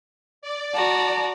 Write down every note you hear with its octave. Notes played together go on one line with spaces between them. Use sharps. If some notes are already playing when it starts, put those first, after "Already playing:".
D5
F#4 A5 A#5